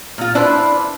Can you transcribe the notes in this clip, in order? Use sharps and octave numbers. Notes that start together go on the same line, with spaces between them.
A#2 F4
D4 E4 B4 C5